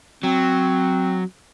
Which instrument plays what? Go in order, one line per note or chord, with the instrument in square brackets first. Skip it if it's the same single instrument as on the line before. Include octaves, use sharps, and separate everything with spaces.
[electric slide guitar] F#3 [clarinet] C4